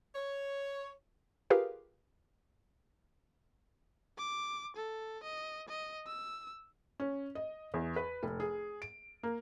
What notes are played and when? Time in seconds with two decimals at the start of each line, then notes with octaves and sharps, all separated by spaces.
0.15 C#5
1.50 F4 G4 G#4 A#4 B4 F5
4.18 D6
4.77 A4
5.24 D#5
5.69 D#5
6.07 E6
7.00 C#4
7.35 D#5
7.74 E2
7.96 B4
8.23 F1
8.40 G#4
8.82 D7
9.23 A#3